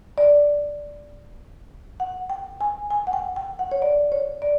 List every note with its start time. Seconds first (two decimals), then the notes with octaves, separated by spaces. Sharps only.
0.18 D5
2.00 F#5
2.30 G5
2.61 G#5
2.91 G#5
3.07 F#5
3.13 G5
3.36 G5
3.59 F#5
3.72 C#5
3.82 D5
4.12 C#5
4.42 D5